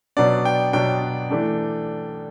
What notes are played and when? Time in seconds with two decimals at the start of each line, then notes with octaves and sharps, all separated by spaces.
0.17 B2 F#3 B3 D4 D5
0.45 G5
0.73 B2 F#3 B3 D4 G5
1.30 E3 A3 D4